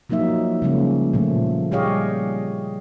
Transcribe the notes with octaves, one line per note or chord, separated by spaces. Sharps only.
F3 F#3 A#3 D#4 E5
C#3 F3 G3 G#3 A#3 C#4
A#2 F3 A3
G3 G4 G#4 C#5 D#5 F5